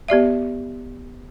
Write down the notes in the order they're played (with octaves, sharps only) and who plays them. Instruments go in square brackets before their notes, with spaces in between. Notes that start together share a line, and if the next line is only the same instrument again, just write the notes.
[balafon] B3 G4 D5 E5